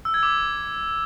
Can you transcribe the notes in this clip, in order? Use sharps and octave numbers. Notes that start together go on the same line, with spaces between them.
E6
G#6
D6